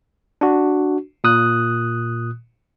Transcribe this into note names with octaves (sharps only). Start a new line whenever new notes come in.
D4 F#4
A#2 D#6 F#6